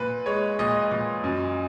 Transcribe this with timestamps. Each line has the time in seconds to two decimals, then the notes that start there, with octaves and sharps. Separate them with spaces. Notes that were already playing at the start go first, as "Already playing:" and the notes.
Already playing: A#2 B4
0.26 G#3 C#5
0.59 A#2 D#5
0.91 A#2
1.24 F#2